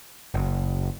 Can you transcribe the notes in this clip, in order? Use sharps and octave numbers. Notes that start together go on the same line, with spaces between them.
F#1